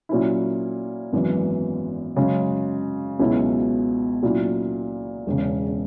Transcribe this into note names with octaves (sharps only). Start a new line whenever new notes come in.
A#2 F#3 C#4 E4
G#1 F#2 E3 B3
F#2 C#3 G#3
C#2 B2 F#3 C#4 E4
A#2 F#3 C#4 E4
E1 E2 C#3